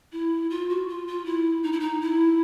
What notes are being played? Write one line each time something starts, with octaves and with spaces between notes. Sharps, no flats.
E4
F4
F#4
F4
F4
E4
D#4
E4
D#4
E4